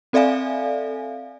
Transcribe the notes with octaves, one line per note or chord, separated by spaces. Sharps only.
C4 A4 D5 E5 F5 G#5